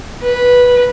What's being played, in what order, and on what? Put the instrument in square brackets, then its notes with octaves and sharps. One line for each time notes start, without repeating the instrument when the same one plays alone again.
[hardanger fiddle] B4